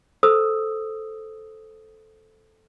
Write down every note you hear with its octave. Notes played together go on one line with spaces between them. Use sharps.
A4 C5 D#6 E6